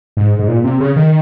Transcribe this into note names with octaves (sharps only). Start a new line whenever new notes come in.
G#2
G#2
A#2
C3
C#3
D#3